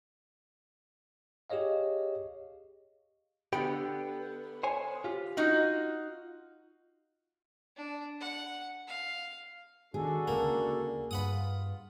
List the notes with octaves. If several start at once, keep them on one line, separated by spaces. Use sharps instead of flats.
G4 G#4 C#5 D#5 F5
D3 B3 G4 G5 B5
C5 C#5 G#5
F4 G4
D#4 F4 F#4
D4
F#5
F5
D#3 D4 F#4 G#4 A4
D2 C#3 A#3
G2 F4 B4 F#5 D#6